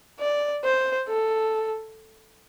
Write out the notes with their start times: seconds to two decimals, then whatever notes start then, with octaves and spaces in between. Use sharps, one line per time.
0.20 D5
0.64 C5
1.08 A4